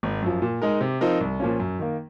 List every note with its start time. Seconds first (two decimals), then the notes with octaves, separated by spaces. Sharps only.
0.03 G#1
0.22 F#2 F3
0.42 A#2
0.62 G#3 D#4 A#4
0.81 C3
1.01 F3 C4 D#4 A#4
1.21 C2
1.40 A#2 F3 A#3 C#4
1.60 F#2
1.79 D#3 A#3